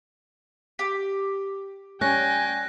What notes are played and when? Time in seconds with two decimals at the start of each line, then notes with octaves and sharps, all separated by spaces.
0.79 G4
2.01 G3 C#4 G5 G#5 F#6 A#6